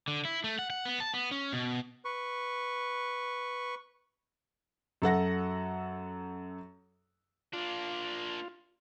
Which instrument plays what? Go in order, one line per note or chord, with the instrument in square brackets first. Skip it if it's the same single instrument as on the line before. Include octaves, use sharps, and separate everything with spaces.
[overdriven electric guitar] D3
E4
A3
F#5
F#5
B3
A5
B3
C#4
B2
[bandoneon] B4 C#6
[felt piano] F#2 A4 F#5 A#6
[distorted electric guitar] A#3 D4 [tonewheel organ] F4